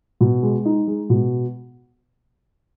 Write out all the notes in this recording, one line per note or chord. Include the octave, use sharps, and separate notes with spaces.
B2
G#3
D#4
G#3
B2